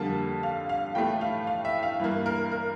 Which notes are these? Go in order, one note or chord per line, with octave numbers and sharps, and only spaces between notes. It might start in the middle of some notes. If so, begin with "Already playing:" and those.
Already playing: F2 D3 G3 A#3 A5
F5
F5
A2 E3 A3 G5
F5
F5
E5
F5
G2 E3 A#3
A#4
A#4